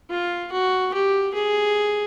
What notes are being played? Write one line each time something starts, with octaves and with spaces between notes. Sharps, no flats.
F4
F#4
G4
G#4